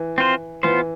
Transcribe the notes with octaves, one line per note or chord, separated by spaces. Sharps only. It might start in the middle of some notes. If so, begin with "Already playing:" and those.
Already playing: E3
C4 F4 C5
E3 B3 F4 C5